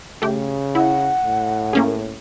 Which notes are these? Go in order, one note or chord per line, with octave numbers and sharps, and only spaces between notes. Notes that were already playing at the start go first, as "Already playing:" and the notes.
C#3 A3 G4
E4 F#5
A2
A#3 C#4 G#4